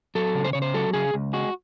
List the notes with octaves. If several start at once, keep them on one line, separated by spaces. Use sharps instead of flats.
F#3 A4
C#3
C5
C#3 C#5
C5
F#3 A4
C#3 G#4
C#2
G#3 F#4